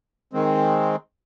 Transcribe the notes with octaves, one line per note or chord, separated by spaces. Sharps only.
D#3 G#3 C4